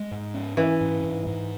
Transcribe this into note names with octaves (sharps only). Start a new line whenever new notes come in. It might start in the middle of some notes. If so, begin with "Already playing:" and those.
Already playing: G#3
G#2
C#4
E3 C#4
G#2
G#2
G#2